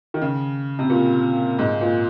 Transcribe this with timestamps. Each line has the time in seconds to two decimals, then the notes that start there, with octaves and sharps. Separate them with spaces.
0.14 D#3
0.21 C#3
0.79 C3
0.90 A#2
1.59 G#2
1.81 A#2